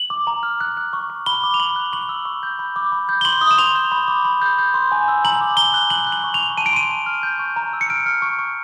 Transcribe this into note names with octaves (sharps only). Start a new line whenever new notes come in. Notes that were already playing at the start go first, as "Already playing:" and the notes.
Already playing: F#7
D6
A#5
F6
F#6
F#6
C#6
C#6
B5 G7
D6
F7
B5 F#7
F#6
C#6 F#7
E6
C#6
G6
B5
D6
B5
G6
G7
C6 F#7
D#6
E7
C6 F7
G6
B5
D6
B5
G6
G6
C6
G#5
E6
A#5 F#7
D6
A#5 G7
F#6
F#6 F#7
F#6
F#7
C#6
F7
C#6
A5 D#7
D7
C6 D#7
A5
F6
G6
C#6
A#5
E6
C#7
F6 D7
F6
C#6
C#6